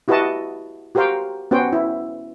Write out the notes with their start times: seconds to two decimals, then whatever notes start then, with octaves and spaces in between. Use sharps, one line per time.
0.08 E4 F#4 G4 B4 D#5 A5
0.95 F#4 G4 A#4 C5 F5 G5
1.51 B3 C#4 F#4 C5 G5
1.73 E4